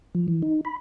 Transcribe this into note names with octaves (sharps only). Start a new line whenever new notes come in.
F3
E3
D#4
B5